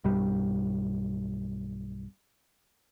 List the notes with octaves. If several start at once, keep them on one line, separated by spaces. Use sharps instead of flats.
B1 G2 G3